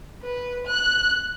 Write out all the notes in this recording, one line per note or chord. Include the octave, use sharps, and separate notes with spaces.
B4
F#6